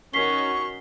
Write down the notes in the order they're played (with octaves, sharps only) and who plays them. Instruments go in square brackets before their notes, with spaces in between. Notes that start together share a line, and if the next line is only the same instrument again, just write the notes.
[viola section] D#3 C#4 F#4 [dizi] C#6 [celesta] B6 C7 G7